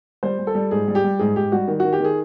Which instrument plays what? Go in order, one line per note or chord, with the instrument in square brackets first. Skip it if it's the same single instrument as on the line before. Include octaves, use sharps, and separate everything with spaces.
[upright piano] G3 C5
G3
A4
G3
G#2 G#4
G3
G4
G3
G#2 G#4
G#2 G4
G3 F#4
D#3
D#3 F#4
G4
D#3 G#4